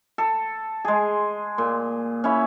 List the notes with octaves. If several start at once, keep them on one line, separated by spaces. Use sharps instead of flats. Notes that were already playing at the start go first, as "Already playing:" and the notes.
A4
G#3 G#4
A#2
C#4 E4